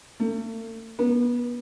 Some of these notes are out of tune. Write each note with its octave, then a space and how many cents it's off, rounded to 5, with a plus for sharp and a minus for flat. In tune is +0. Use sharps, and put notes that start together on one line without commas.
A3 +45
B3 -30